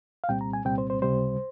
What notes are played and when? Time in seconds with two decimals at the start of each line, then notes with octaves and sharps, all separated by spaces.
0.24 F5
0.29 C2 A#2 G3 C4 G5
0.41 A#5
0.53 G#5
0.65 C2 A#2 G3 C4 G5
0.78 C5
0.90 C5
1.02 C#2 C3 G3 C5